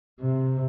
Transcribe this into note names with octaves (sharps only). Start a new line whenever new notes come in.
C3